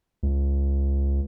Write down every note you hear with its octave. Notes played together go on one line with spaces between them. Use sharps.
C#2